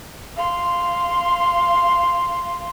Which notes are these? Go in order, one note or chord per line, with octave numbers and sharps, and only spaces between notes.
F5 C6